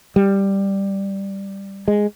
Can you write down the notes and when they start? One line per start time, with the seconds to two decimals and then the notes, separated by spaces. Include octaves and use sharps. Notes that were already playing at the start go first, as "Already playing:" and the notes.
0.16 G3
1.88 G#3